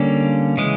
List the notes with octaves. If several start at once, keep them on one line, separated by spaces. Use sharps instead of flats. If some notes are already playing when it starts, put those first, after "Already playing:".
Already playing: D3 G3 A#3 C#4
C#3 E3 G#3